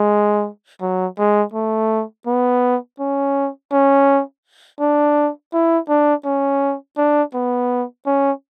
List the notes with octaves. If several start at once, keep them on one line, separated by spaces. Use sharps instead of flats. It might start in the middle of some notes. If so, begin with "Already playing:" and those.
Already playing: G#3
F#3
G#3
A3
B3
C#4
C#4
D4
E4
D4
C#4
D4
B3
C#4